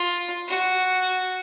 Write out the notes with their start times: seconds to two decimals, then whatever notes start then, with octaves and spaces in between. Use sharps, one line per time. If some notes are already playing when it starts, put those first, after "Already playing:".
Already playing: F4
0.48 F#4